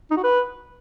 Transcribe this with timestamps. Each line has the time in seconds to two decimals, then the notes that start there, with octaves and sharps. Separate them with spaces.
0.11 D#4
0.17 F#4
0.24 B4